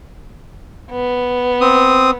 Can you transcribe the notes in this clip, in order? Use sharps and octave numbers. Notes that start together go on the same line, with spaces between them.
B3
C4 D#6